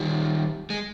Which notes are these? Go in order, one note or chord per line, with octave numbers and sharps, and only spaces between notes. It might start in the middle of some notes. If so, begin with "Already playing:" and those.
Already playing: D#3 G3
G#3